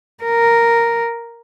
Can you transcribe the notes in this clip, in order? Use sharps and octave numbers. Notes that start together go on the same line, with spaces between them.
A#4